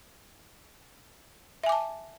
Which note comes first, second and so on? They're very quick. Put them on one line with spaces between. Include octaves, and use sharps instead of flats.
E5 G#5 D6 A5